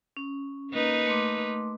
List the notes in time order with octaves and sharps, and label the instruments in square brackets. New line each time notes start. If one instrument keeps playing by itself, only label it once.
[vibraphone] C#4
[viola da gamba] A#3 D#4 B4
[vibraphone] A3 C6 D6